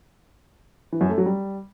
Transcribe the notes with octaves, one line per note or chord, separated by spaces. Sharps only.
E3
F#2
A3
F#3
G3